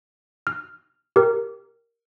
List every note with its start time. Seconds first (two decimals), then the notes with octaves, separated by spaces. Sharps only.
0.47 F6
1.16 G4 A#4